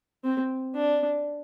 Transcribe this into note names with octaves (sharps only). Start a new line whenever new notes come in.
C4
D4